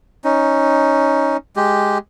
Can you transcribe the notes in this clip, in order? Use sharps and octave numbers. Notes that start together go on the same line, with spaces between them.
C#4 D#4
G#3 G4